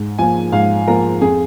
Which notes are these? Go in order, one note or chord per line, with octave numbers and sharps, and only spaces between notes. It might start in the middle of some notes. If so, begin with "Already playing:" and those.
Already playing: G#2
F3 A#3 G#5
G#2 F5
F3 A#3 A#4
F2 G#4